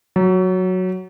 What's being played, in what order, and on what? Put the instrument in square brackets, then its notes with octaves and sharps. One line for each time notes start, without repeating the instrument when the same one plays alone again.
[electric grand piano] F#3